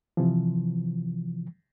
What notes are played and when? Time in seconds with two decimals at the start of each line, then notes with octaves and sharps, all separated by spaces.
0.17 C3 E3 F3